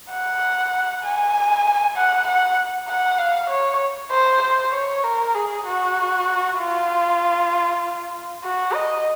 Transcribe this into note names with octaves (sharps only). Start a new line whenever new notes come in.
F#5
G#5
F#5
F#5
F#5
F5
C#5
C5
C5
C#5
A#4
G#4
F#4
F4
F#4
D#5